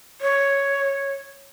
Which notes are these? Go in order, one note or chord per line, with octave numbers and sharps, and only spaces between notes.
C#5